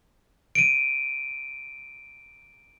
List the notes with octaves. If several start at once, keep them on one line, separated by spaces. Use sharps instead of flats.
D7 D#7